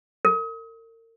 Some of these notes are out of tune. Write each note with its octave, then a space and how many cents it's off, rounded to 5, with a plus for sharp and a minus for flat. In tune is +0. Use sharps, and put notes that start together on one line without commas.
A#4 -40